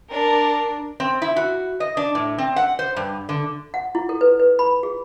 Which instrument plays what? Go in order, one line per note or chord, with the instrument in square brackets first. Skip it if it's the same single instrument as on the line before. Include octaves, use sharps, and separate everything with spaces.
[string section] D4 [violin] A#4
[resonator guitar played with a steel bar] C4
E4
F#4
D#5
D4
A2
C4
F#5
C5
G2
D3
[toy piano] F#5
E4
A4
B4
B4
B5
G#4